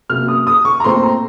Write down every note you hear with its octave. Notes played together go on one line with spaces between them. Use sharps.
C3 F#3 A#3 C#4 F6
D#6
D#6
C#6
A#5
A#2 A3 C4 C6
A#5